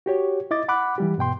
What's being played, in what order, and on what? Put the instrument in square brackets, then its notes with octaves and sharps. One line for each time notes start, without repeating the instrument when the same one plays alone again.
[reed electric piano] F#4 G4 C#5
E4 D#5 D6 A6
F#5 B5 D6 F#6
E3 G3 G4
G2 B2 G5 C6